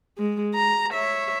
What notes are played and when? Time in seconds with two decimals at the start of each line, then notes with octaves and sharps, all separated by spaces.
0.18 G#3
0.55 A#5
0.93 C#5 E5